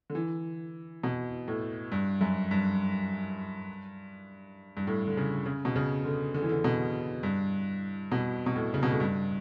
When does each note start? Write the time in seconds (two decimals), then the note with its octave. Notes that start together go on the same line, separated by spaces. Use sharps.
0.10 D3
0.15 E3
1.03 B2
1.48 A2
1.92 G2
2.21 F#2
2.51 G2
4.77 G2
4.87 A2
5.07 D3
5.17 C#3
5.46 C#3
5.65 B2
5.76 C#3
6.05 D3
6.34 D3
6.42 E3
6.49 D3
6.64 B2
7.23 G2
8.12 B2
8.46 B2
8.56 A2
8.74 C#3
8.83 B2
8.91 A2
9.00 G2